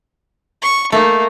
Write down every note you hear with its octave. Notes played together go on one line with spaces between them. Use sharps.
C#6
A3 A#3 D#4